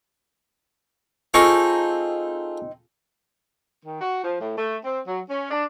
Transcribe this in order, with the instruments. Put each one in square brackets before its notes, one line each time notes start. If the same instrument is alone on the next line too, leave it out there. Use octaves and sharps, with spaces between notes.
[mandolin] C4 D#4 C#6 [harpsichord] F4 G#4 A4
[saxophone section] D#3
F#4
F3
A2
A3
C4
F#3
C#4
D4